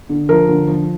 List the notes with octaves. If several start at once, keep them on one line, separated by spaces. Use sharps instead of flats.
D3
F3 A#4
D3
F3